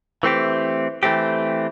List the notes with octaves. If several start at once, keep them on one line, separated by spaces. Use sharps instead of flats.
E3 A3 C4 G4
E3 A3 C4 G4